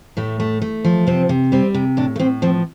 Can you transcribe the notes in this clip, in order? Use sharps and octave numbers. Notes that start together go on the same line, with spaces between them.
A2 A3
A3
A3
F3
C3 C4
C3
G3 C4
C3
A2 D4
A3
A2 C4
F3 C4